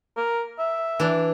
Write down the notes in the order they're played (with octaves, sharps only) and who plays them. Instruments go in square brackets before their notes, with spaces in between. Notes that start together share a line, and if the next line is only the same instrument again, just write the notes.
[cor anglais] A#4
E5
[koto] E3 D4